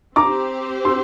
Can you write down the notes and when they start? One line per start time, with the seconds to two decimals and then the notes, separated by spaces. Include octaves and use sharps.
0.16 C4 G4 C5 A#5 D6
0.85 C6 E6